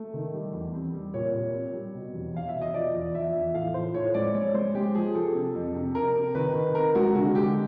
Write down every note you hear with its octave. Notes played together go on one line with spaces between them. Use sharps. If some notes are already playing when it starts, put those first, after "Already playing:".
Already playing: A3
D#3
G3
E2
C4
G3
A#2 C#5
A#2
C4
G3
B2
E2
E2 F5
E5
B2
D#5
F3 D5
E2
F3 E5
E2
A2 F5
F3 C5
A2 C#5
G#3 D5
G#3 C#5
G#3 C5
G#3 G4
F3 G#4
F3 A4
C3
F2
C3
C3 A#4
C3
D#3 B4
D#3
C4 A#4
G#3 F#4
D3 F#4
G#3 G4